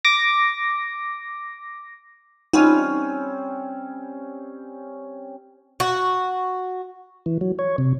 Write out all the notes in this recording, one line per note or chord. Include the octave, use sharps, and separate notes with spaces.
D6 A#6
G3 C4 C#4 D#4 F4
F#4
E3
F#3
C#5
C3